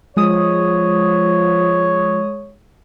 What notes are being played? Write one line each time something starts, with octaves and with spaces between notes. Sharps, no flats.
F3 G#3 C#5 D#6